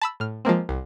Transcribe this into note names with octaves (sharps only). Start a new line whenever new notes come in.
A5 B5 E6
A2 F6
F3 G#3 A#3 C4
C2